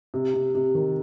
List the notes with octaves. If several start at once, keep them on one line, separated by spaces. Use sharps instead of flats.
C3
C3
C3
D#3